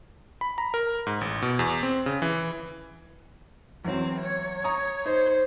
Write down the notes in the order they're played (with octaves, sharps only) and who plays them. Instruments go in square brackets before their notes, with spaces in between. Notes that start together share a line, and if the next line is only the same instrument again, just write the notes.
[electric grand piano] B5
A#5
A#4
G#2
A1
B2
E2
C4
C#3
E3
[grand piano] E2 F#3 [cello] E3 C4
[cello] C#5
[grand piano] A#5 C#6 D#6
[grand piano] D#4 [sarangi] C5